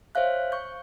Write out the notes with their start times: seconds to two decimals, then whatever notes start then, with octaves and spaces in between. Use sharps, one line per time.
0.15 C5 C#5 E5 F5 F#6
0.52 C#6 G6